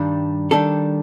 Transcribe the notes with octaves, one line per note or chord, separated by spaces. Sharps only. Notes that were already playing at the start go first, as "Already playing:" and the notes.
Already playing: G2 D#3 G3 D4
D#3 G3 D4 A4